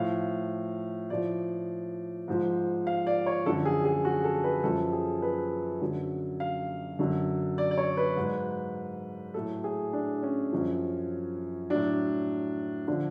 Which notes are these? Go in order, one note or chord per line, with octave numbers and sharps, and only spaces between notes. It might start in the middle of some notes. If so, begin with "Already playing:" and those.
Already playing: A2 F3 F5
A2 F3 D5
G#2 F3
F5
D5
C#5
F#2 D3 F3 A4
G#4
G#4
F#4
A4
B4
F#2 F3 A4
G#4
B4
F#2 D3 F#3
F5
F#2 D3 F#3
D5
D5
C#5
B4
G#2 F#3
A2 F#3 A4
G#4
D4
C#4
F#2 F3
A2 F#3 D4
D3 F3 D4